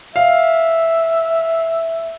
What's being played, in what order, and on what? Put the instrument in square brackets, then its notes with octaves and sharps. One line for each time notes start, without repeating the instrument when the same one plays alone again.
[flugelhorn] E5 [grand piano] F5